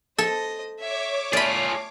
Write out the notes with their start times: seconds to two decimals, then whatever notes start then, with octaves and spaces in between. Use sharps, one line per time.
0.18 A4 C5 D#5
0.79 C#5 E5 D6
1.33 A3 F4 G#4 D5 B5